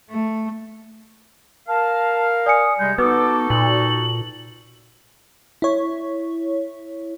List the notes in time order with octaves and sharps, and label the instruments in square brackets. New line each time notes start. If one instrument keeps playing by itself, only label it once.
[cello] A3
[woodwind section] A#4 F5 [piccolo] A5
[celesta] D5 G#5 C#7 [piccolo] D#6
[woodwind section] C3 G3 G#3 [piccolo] G6
[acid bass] B3 [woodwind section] D#4 F#4 A4 [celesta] B4 [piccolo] D6
[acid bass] A#2 [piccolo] F#7
[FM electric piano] E4 C#5